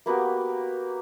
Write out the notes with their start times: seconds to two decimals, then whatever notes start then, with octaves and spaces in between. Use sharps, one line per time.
0.06 A#3 B3 F#4 G4